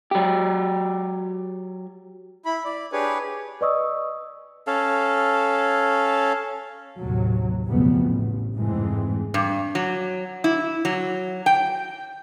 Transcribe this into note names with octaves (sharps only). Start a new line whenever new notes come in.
F#3 G4
E4 B5
D5
D4 G4 G#4 B4 C#5
B4 D5 D#5 C#6 D#6 E6
C#4 A4 F5
A1 D#2 C3 F#3
B1 F2 C#3 G3 A3 B3
A1
F1 G#2 E3 G#3 A3 C4
G2
F#3
E4
F#3
G5